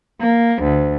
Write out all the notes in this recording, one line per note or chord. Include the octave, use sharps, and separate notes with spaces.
A#3
D2